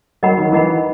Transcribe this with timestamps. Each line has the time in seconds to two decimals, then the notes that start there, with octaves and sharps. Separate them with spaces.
0.23 F#3 A#4 D#5 F#5 B5
0.37 D#3
0.52 E3 A#4 D#5 F#5 B5